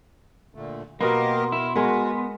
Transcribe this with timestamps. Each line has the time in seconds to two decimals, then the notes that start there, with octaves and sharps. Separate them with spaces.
0.55 A#2 D3 A3
1.01 B2 A#3 B3 G4 A#4 D#5 C6
1.52 E4 A#4
1.76 G#3 B3 F#4 A#4